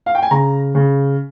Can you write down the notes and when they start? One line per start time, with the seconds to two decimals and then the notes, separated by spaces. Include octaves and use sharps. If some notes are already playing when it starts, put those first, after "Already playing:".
0.06 F5
0.15 G5
0.22 G#5
0.31 C#3 A#5
0.75 C#3